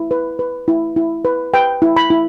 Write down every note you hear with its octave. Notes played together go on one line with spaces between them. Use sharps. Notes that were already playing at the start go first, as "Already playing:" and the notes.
Already playing: E4
B4
B4
E4
E4
B4
B4 G5
E4
B5
E4